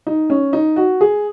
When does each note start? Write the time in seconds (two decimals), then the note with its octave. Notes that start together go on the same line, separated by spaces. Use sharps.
0.07 D#4
0.30 C#4
0.53 D#4
0.76 F#4
1.01 G#4